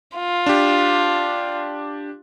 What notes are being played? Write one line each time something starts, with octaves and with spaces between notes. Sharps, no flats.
F4
D4 G4